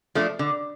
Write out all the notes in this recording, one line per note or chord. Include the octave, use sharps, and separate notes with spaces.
F3 A3 D4
D3